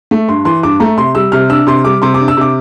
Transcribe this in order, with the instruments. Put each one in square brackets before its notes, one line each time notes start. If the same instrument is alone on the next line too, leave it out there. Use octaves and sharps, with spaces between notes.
[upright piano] A3
G2 C6
E3 C6
G2 D6
A3 A#5
C3 C6
G3 E6
C3 F6
D4 E6
C3 C6
G3 D6
C3 C6
D6
D4
E6
C3 D6